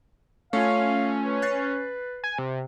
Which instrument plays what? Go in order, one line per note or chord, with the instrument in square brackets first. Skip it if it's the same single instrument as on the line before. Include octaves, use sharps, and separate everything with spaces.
[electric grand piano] A3 F4 [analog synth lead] C#4 [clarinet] F5
[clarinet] B4
[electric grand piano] F#6 A6 C7
[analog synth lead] G#5
C3